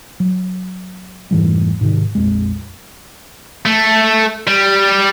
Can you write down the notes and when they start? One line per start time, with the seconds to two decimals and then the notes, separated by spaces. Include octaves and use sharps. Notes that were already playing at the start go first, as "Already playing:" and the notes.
0.20 F#3
1.31 F1 G#2 E3 G3
1.81 G#2 C3 D#3
2.15 A#1 F2 G#3
3.66 A3
4.47 G3